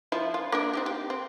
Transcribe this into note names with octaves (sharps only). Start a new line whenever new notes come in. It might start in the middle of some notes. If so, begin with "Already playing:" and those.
F3 E4 F4
F4
A#3 D4 A#4
C4 D#4 G4
G4
C4